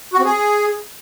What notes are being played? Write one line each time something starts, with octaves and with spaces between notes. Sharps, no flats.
F#4
C4
G#4